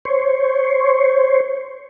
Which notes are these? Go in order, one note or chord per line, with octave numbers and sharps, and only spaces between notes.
C5 C#5